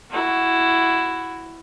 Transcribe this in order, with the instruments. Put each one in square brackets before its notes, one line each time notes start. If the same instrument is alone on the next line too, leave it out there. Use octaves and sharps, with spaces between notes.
[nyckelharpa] E4 F#4